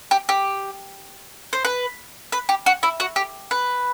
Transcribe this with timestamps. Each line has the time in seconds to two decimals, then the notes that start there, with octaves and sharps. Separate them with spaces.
0.11 G4
0.29 G4
1.53 C5
1.65 B4
2.32 B4
2.49 G4
2.66 F#4
2.83 E4
3.00 F#4
3.16 G4
3.51 B4